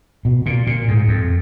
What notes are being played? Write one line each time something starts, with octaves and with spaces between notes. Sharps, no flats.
B2
A#2
A#2
G#2
F2